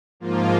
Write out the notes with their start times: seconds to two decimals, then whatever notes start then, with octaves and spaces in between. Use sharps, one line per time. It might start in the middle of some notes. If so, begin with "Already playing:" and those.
0.20 G#2 F3 A#3 F4